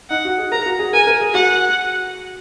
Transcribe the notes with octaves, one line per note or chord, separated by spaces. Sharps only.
D#4 F#5
F#4
G#4
A#4 A#5
F#4
G#4
A#4 G#5
A#4
G#4
F#4 F#5